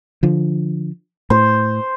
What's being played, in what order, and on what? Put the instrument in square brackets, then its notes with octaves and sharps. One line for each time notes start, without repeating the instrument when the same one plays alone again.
[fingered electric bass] D3 F3
[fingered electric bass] A2 [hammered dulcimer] C5